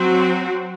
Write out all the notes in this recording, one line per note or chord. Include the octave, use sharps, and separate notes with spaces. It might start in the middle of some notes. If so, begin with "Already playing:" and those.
Already playing: F#3 C4 F#4 C5